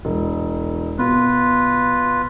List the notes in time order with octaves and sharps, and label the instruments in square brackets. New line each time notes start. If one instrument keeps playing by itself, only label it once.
[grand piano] E1
[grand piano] B2 [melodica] F4 B4